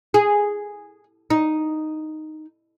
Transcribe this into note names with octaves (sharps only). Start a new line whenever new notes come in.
G#4
D#4